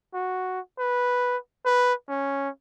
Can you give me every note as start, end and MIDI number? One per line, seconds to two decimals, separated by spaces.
0.14 0.60 66
0.79 1.37 71
1.66 1.94 71
2.09 2.49 61